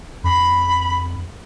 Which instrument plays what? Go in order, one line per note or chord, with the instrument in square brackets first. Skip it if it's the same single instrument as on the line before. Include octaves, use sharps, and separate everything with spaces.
[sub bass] F2 [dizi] B5